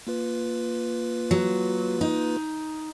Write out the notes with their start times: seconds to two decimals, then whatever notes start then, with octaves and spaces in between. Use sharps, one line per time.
0.07 A#3 F4 B4
1.31 F#3
2.01 D#4